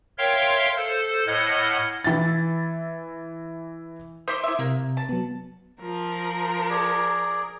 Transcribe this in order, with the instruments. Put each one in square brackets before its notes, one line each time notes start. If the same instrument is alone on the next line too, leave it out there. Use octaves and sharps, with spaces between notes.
[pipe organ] A#4 C#5 E5 F5 G5 C6
A4 C5
A2 D#5 F#5 F6 G#6 A#6
[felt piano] E3 E5 A6
[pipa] C5 E5 C6 [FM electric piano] D6 D#6
[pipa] E4 E5
[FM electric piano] C3 [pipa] A#3
[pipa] A5
[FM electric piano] F#3 B3
[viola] F3 [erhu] A#4
[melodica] G#4 D5